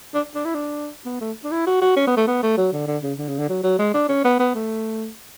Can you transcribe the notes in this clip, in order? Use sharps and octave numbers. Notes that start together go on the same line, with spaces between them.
D4
D4
E4
D4
B3
A3
D4
E4
F#4
F#4
C#4
B3
A3
B3
A3
F#3
D3
D3
C#3
D3
C#3
D3
F#3
F#3
G#3
D4
C#4
B3
B3
A3